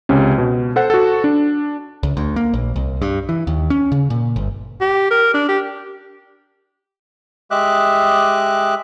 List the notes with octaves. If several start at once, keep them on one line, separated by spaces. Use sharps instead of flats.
C#2 C3 C#4
B2
A4 C5 F#5
F#4 A4
D4
C#2
D2
A#3
A#1
C2
G2
E3
D#2
C#4
C#3
A#2
G1
G4
A#4
D4
G4
G#3 G4 D#5 E5 D6 F#6